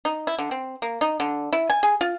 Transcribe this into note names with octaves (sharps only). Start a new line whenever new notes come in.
D#4
E4
D3
C4
A#3
D#4
D3
E4
G#5
G#4
F4